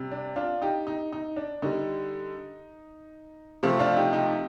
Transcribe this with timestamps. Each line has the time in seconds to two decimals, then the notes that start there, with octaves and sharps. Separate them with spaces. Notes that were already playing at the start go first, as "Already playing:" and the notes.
Already playing: C3 G3
0.11 D4
0.36 D4 F4
0.62 D#4 G4
0.87 D#4
1.12 D#4
1.36 D4
1.62 D3 G3 D#4
3.63 C3 F3 A3
3.79 D4 F4
3.96 D#4 G4
4.13 D#4 G4